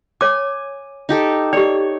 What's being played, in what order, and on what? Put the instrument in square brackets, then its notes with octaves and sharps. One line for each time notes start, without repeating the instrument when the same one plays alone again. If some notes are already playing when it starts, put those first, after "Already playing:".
[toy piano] C#5 D6 [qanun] G#5
[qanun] D#4 G4 A4
[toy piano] G4 D5 [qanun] C#5